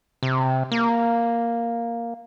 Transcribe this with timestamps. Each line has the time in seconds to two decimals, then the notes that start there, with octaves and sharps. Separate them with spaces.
0.23 C3
0.72 A#3